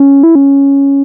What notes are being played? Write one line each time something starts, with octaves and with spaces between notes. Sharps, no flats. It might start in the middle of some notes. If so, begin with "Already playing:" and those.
Already playing: C#4
E4
C#4